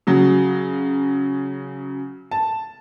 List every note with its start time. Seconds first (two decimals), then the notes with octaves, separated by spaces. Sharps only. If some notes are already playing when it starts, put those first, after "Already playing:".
0.07 C#3 F#3
2.31 A5